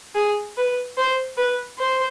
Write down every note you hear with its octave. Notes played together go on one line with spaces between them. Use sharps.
G#4
B4
C5
B4
C5